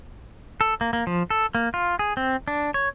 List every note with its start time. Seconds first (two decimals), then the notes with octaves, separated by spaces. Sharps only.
0.61 A4
0.81 A#3
0.93 A#3
1.07 F3
1.30 A4
1.55 A#3
1.74 F4
1.99 G#4
2.17 C4
2.48 D4
2.74 C#5